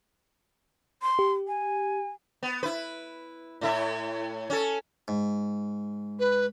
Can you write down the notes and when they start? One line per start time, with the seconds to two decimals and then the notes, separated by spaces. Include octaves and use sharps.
1.02 C6
1.19 G4
1.48 G#5
2.43 B3
2.63 E4 B4
3.61 A2 E4 E5
4.50 C#4 A4
5.08 G#2
6.19 B4